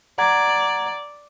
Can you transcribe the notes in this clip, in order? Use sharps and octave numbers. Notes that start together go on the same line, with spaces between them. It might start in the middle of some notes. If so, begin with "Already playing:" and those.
D5 F#5 A#5 G#6